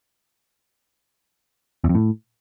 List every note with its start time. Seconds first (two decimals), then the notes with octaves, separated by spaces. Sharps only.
1.84 E2
1.89 F2
1.95 A2